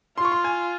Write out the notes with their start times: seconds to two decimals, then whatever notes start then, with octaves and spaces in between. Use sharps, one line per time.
0.18 F4 C6
0.25 C#6
0.32 C6
0.44 G#5